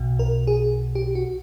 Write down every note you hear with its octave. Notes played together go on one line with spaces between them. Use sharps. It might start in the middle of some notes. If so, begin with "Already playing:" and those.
Already playing: B1 B2
A#4
G#4
G4
F#4